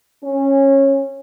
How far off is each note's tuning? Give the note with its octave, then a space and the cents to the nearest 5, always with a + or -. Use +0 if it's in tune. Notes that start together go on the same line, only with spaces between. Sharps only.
C#4 -15